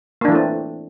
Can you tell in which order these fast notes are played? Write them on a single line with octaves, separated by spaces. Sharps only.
A#3 D4 E3 A3 C4